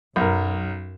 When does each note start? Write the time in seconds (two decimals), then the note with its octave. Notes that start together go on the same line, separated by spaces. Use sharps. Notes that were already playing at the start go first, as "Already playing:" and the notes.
0.16 B1 F#2 A#4